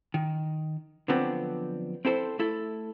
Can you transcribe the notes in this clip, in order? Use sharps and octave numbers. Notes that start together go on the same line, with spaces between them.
D#3
D3 F3 F#3 B3 C4 D4
C4 E4 A4 C5
A3 E4 A4